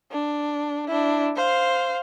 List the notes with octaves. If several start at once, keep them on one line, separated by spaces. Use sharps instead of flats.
D4
D4 E4
C5 F5